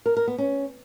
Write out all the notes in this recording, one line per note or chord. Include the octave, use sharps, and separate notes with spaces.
A#4
A#4
B3
C#4